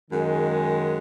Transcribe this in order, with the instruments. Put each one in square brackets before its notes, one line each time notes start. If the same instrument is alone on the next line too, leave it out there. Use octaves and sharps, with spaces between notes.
[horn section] F#2 D#3 G#3